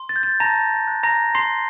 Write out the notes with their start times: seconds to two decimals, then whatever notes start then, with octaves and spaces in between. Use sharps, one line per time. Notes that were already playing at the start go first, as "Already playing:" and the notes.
Already playing: C6
0.09 A6
0.16 G6
0.23 A6
0.40 A5 A#5 A#6
0.88 F#6
1.03 A#5 A#6
1.35 A#5 C6 C7